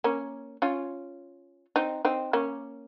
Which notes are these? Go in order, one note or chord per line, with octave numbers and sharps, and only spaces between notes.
A#3 C#4
C#4 F4
C4 D#4
C4 D#4
A#3 C#4